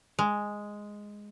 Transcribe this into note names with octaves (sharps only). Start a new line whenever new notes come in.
G#3